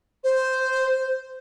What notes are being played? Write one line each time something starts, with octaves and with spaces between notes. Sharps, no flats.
C5